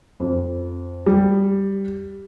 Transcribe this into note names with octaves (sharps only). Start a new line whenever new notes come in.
F2
G3